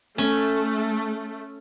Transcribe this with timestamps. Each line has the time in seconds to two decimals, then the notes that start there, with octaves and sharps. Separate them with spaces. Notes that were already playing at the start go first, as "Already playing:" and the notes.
0.18 A3 C#4